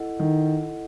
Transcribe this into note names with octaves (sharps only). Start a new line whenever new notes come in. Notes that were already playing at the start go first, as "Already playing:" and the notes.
Already playing: E4 A4 D#5 F#5
D#3